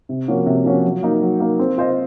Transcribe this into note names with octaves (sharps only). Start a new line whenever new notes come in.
C3
F3 A#3 C#4 F#4
C3
F3 A#3 C#4 F#4
F#3
A#3 D#4
F#3
A#3 D#4
C4
F4 C5 D#5